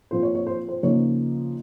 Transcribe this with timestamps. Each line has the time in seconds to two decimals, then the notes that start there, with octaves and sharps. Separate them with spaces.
0.11 A#2 F3 C4 F4 C5
0.23 C#5
0.35 C#5
0.47 C5
0.69 C5
0.83 C#3 F3 A#3 D#4 C#5